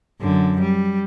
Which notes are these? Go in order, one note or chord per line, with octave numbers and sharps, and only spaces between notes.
F#2 D3
G3